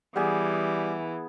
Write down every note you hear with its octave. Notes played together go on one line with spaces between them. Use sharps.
E3 G3 B3 G#4